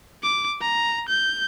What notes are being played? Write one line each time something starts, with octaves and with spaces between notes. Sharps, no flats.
D6
A#5
G6